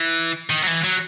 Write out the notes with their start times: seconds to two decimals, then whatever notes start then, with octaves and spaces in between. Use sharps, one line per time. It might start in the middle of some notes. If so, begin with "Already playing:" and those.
Already playing: E3
0.50 D#3
0.62 F#3
0.67 E3
0.84 F#3